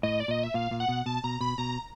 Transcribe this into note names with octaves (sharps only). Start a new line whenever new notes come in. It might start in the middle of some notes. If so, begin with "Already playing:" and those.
A2 D#5
D5
A#2 D#5
E5
A#2 F5
A#2
F#5
B2
B2 A5
B2 A#5
B2 B5
B2 A#5